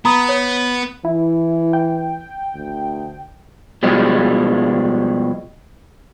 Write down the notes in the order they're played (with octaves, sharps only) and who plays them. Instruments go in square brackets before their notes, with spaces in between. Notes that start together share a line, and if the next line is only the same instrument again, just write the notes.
[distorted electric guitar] B3 [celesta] A#5 B5 D#6
[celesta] C#5
[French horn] E3 [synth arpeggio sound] E4
[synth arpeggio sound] G5
[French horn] D2
[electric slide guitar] B2 F3 G3 G#3